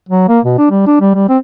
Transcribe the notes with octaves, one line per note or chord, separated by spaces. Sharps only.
F#3
A#3
B2
D4
G3
D4
G3
G3
C4